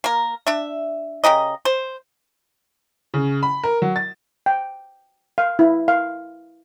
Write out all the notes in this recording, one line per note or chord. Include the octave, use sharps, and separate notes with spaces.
A#3 A#4
D4 E5
C#3 G4 A#4 D#5
C5
C#3
B5
A#4
F#3
A6
G5
F5
E4
F5